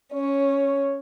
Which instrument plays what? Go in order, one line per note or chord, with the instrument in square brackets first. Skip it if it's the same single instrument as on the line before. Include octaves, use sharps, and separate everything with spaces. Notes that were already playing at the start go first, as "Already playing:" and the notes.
[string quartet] C#4 [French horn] C#5